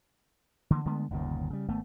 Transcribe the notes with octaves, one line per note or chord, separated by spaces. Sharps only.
D3 E3 A#3
D3 G#3 A3 B3
G1 D#2 A#2 C#3
C#3 G3
G#1 A3 B3